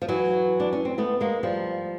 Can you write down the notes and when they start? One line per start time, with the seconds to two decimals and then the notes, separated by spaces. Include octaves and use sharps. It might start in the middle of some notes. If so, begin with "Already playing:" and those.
0.02 F3
0.09 E3 F#3
0.60 D4
0.73 C#4
0.85 C4
0.98 A3 B3
1.20 G#3 A#3
1.43 F3 G3